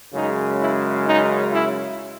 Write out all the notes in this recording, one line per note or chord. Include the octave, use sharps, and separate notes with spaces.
F#2 C#3 G#3 D#4
E4
D#4
E4